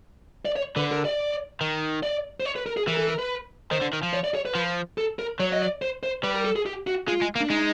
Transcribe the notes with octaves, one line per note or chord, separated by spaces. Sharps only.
D5
C#5
D3 B4
A#4
D5
D#3
D5
C5
C#5
B4
A#4
G#4
E3 A#4
A4
A#4
B4
D#3 C5
D3
D#3
F3
C#5
D5
C#5
B4
F3
A4
A#4
F#3 C#5
D#5
D5
C5
C5
G3 B4
A#4
A4
G#4
G4
F#4
G#3 F4
G#3
A#3
D4
G#3 D#4